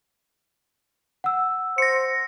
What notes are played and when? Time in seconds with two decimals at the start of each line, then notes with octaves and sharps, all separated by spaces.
1.24 F#5 E6
1.78 C5 A#6 C#7